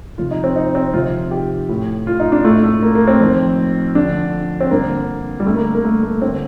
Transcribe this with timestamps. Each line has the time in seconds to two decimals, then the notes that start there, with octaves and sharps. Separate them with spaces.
0.18 F2 C3 D#3 F4
0.31 D#4
0.44 C4
0.56 D#4
0.75 C4
0.93 F2 C3 D#3 F4
1.31 G4
1.69 A2
2.07 F4
2.20 D#4
2.32 D4
2.45 A2 A3
2.64 A3
2.82 A#3
2.95 A#3
3.08 C4
3.20 F2 D#3
3.95 F2 D3 D4
4.60 C4
4.71 G2 D3 A#3
5.40 G3
5.46 G2 D3 A3
5.56 A#3
5.75 A#3
5.85 A3
6.03 A3
6.22 D3 C4